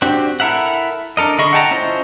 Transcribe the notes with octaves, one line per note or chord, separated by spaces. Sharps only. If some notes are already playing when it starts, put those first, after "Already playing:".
C4 D4 F#4 G4
E4 A4 A#4 E5 F#5
D4 A4 A#4 D#5
D3 E4 G#4 D#5 C#6
F#5 G5 A5 A#5
C#4 E4 F4 C5 D#5